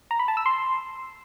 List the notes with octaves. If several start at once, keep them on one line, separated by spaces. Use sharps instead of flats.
A#5
B5
A5
E6
C6